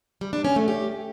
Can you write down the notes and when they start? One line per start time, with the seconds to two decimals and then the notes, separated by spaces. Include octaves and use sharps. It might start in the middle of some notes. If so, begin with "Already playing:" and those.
0.21 G3
0.33 D4
0.44 C#4
0.56 A3
0.68 G4